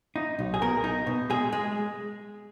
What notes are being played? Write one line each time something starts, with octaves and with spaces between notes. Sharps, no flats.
D#4
B1
G#4
B2 A#4
D#4
B2
G#3 G#4
G#3